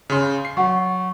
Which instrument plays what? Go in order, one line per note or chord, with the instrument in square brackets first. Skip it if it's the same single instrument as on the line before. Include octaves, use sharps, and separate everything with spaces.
[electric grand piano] C#3 C6
C7
[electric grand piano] F#3 [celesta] F#5 C#6